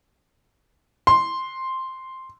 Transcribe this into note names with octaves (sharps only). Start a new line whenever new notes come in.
C6